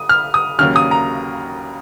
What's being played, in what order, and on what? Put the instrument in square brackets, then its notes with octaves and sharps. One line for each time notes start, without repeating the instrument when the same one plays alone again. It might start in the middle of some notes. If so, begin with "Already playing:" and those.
Already playing: [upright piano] D#6
F6
D#6
D#2 C#3 F#3 A#3 F6
D#6
A#5